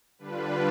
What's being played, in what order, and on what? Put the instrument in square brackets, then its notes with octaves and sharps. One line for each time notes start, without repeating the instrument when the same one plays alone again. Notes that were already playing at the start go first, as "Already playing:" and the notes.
[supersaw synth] D3 G3 D4 F4 B4